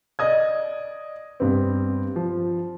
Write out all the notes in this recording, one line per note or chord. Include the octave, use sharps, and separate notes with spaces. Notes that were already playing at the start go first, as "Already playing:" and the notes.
D5 D#5 D#6 G#6
G2 B3 C4
F3